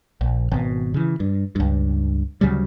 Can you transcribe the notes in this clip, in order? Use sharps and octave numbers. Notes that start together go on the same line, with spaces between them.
A#1
G#1 B2
C#3 E3
G2
C#2 G2
D2 C#3 F#3 G3